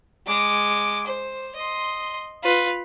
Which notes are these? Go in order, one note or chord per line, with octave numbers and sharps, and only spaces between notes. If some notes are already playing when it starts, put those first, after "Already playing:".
G#3 D6
C5
D#5 C6
F4 B4